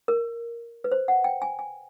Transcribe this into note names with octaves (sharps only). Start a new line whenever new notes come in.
A#4
B4
C5
F#5
G5
G#5
G#5